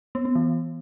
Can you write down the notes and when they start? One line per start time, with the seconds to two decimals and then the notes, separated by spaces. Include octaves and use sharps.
0.15 B3
0.25 B3
0.35 E3